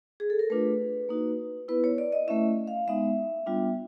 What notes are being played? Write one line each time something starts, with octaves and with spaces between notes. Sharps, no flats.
G#4
A4
A#4
A3 D4 F4 B4
A#3 D#4 F#4
B3 E4 B4
C#5
D5
D#5
A3 C#4 E4 E5
F5
G#3 B3 D#4 E5
G3 B3 D4 F4